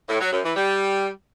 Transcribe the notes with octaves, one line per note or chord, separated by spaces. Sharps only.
A2
F#3
F#2
E3
G3